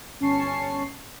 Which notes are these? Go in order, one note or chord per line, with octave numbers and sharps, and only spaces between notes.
G1 C#4 A5 C#6 C7